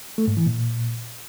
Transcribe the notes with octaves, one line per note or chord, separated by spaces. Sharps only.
A3
G#2
E3
A#2